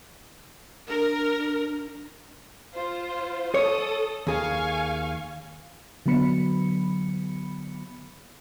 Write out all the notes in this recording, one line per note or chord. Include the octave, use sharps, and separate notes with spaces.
D4 A#4
F4 C5
A4 C#5 D#6
D#2 G#4 F5 G#5 C#6
D3 F#3 B3 B5 C#7